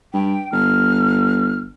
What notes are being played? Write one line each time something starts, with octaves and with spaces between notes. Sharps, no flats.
G2 G5
G1 F6